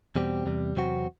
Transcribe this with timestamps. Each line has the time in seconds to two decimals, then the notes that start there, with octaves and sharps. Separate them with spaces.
0.16 E2 B2 G3 C4 G4
0.46 E2 C3 G3
0.76 E2 C3 F#3 C4 F#4